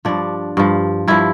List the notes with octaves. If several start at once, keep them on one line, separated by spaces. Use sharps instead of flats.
G2 F3 D4
G2 F3
G2 F3 E4